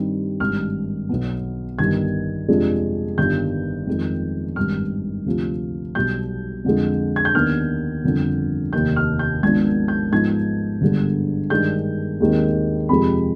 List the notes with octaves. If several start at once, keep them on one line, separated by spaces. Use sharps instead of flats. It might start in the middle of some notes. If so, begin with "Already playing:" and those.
Already playing: G2 D#3 G3 C4 D#4
G#1 G2 D#3 F6
B1 B2 B3
G1 G2 D#3 G#6
F2 C3 F3 G#3 D4
G1 G2 D#3 G6
F2 D#3 G#3
G#1 G2 D#3 F6
D2 C3 F3
B1 B2 G3 G6
F2 D3 F3 G#3
G#6
G6
D#2 D#3 B3 D4 F6
G1 F2 D3
F1 D#2 D#3 G6
F6
G6
G#1 G#2 F3 B3 D4 G#6
G6
G#2 F3 B3 D#4 G#6
G1 G2 D3 G#3
G2 D#3 G#3 D4 G6
D#2 D#3 G#3 C4
F2 C3 F3 G#3 B5